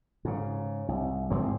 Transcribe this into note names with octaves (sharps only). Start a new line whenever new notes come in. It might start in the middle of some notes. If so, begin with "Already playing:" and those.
G#2 C#3
C2
A1 G#2 F3 C4